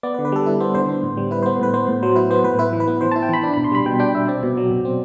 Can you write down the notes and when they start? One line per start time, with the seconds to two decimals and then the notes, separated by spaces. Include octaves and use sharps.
0.03 B3 D5
0.14 B4
0.19 D3
0.25 B4
0.32 G3 A4
0.46 E4
0.60 B3 C5
0.75 D3 C5
0.89 B3
1.03 A2
1.17 G3
1.31 E4 B4
1.43 B3 C5
1.60 A2 B4
1.74 B3 C5
1.88 A2
2.03 F#3 C5
2.16 E4 B4
2.31 B3 C5
2.44 A2 B4
2.59 E4 B4
2.73 E3
2.80 B4
2.88 B3
3.01 E3 C5
3.12 E4 A5
3.23 G5
3.29 E3 B5
3.43 D4 B5
3.54 B2 B5
3.64 C6
3.72 G3 B5
3.86 B2 G5
4.00 D4 G5
4.14 B2 E5
4.28 C4 D5
4.43 B2
4.57 F#3
4.71 B2
4.85 C4